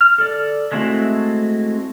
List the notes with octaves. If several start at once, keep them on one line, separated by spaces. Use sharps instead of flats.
F6
A4 D5
G#3 A3 C4 E4 F#4